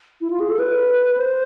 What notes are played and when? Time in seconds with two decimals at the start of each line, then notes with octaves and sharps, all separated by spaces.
0.21 E4
0.30 F4
0.40 G#4
0.50 A4
0.59 B4
1.18 C5